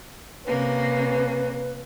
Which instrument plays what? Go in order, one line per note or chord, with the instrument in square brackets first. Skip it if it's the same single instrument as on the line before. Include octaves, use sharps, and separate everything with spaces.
[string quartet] C3 A#3 C#4 [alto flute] B4